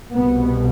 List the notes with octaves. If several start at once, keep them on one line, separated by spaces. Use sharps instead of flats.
C2 B2 B3